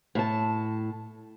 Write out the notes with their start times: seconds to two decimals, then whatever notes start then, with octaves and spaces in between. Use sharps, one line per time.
0.15 A2 A5